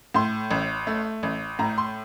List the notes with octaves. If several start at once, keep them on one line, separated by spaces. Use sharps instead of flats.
A2 C6
A1
A3
A1
A2 A#5
C6